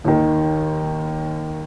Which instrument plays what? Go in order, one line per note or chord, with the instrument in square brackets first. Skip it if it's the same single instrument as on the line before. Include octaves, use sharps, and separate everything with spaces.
[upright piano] D#2 D#3